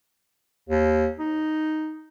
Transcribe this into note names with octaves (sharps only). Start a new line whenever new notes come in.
D#2
D#4